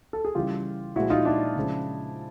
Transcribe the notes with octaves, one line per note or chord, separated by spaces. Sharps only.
A4
G#4
C#3 E3 G3 F4 G4
A#2 F3 G#3 E4 F#4
D#4 F4
D4 E4
C#3 F3 G#3